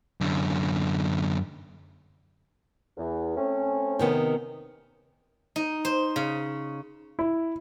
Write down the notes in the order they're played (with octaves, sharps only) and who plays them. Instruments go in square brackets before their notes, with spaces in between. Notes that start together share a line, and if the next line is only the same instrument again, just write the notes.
[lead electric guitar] F#2 D3
[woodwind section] E2
A3 C4 C#4
[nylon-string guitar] C3 D#3 B3
[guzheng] D#4
C5
C#3
[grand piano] E4